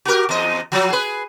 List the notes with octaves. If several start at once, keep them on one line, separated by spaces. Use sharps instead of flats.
F#4 G4 A#4
E2 D#5
F3 F#3
G#4 B4